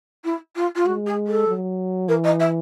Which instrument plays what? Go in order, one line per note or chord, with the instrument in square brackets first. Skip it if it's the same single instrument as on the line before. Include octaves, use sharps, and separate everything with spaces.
[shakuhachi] E4
F4
F4
[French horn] G#3 [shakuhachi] F#4
[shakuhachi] G#4
A4
[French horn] F#3
[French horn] E3 [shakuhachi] A#4
[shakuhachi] D#5
E5